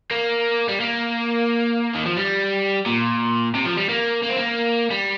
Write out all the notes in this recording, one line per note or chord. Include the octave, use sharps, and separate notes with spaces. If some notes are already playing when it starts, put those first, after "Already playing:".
A#3
G3
A#3
D#3
F3
G3
A#2
C3
F3
G3
A#3
A#3
C4
A#3
G3